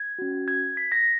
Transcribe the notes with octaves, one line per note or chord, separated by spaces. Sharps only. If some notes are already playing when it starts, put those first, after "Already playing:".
Already playing: G#6
C#4 F#4
G#6
B6
A#6